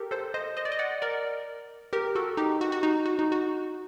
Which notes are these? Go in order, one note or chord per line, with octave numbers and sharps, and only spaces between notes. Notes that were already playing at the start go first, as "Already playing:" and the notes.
Already playing: G4 A4 A#4
A4 C5
C5 D#5
C5 D#5
D5
D#5
D5 F#5
A#4 D5
G4 A#4
F#4 A4
D#4 G4
F#4
F#4
D#4
F#4
D#4
F#4